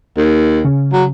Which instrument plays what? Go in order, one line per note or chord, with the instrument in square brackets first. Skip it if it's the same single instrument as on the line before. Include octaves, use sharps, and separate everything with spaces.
[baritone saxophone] D#2
[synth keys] C#3
[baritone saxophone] F#3